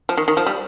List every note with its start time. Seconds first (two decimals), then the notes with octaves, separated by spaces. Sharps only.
0.09 F3
0.17 D#3
0.28 D#3
0.37 F3
0.46 G3